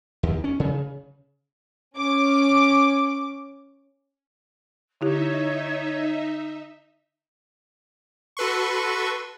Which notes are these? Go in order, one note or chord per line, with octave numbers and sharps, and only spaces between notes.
D#2
C#4
C#3
C#4 D6
D3 D#4 E4 G4 C#5 E5
F#4 A4 B4 C6 C#6